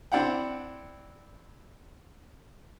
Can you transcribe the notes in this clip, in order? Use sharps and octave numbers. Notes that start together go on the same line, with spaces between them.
C4 D4 E4 F#5 G5